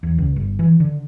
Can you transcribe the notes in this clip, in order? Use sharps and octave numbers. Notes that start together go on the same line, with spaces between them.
E2
C#2
G1
E3
D3